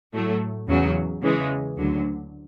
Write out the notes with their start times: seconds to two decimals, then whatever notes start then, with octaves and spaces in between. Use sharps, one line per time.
0.13 A2 F#3 A3
0.68 E2 C#3 F#3
1.22 C#3 E3 G#3
1.77 D2 D3 F#3